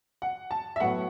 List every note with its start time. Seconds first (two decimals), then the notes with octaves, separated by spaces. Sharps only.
0.22 F#5
0.51 A5
0.76 E5
0.80 A2 F#3 B3 F#5